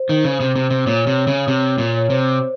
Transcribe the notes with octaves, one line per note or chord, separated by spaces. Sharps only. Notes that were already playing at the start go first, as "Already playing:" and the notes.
Already playing: C5
D#3
C#3
C3
C3
C3
A#2 C#5
C3
C#3
C3
A#2
C#5
C3 C5